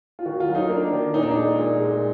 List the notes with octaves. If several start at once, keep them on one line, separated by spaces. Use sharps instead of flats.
F4
D#3 F#4
F4
F#3
D#4
A#3 D4
D#3
A#2 D#4
D4
D#4
G#3
A#2
G#3